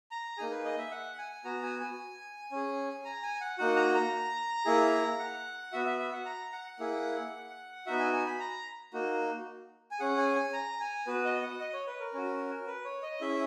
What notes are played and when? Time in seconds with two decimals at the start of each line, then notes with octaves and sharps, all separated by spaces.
0.11 A#5
0.38 A#3 D#4 G#4 G#5
0.51 B4
0.65 D#5
0.78 E5
0.91 F#5
1.18 G#5
1.45 B3 F#4 A#5
1.63 G#5
1.80 G#5
2.52 C#4 G#4
3.05 A#5
3.23 G#5
3.41 F#5
3.58 A#3 D#4 F#4 F#5
3.76 A#5
3.94 A#5
4.65 A#3 E4 G#4
5.19 F#5
5.72 B3 F#4 E5
5.86 E5
5.99 E5
6.13 F#5
6.25 A#5
6.52 F#5
6.80 A#3 E4 G#4
7.86 B3 D#4 F#4 E5
7.99 G#5
8.13 G#5
8.26 B5
8.40 A#5
8.93 A#3 D#4 F#4
9.91 G#5
9.99 C#4 G#4 F#5
10.18 G#5
10.36 G#5
10.53 A#5
10.80 G#5
11.07 B3 F#4 B4
11.25 D#5
11.42 F#5
11.60 D#5
11.73 C#5
11.87 B4
12.00 A#4
12.13 C#4 F#4
12.67 B4
12.85 C#5
13.02 D#5
13.21 C#4 E4 G#4 E5